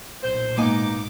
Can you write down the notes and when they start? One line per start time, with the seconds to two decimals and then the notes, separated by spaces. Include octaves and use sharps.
0.23 B1 A#2 C5
0.57 G#2 B2 A#3 B3 D#4 G#5 D6